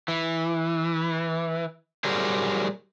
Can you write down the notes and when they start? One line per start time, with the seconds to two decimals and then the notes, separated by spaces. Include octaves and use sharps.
0.08 E3
2.04 F#3 G3 G#4 A#4 C5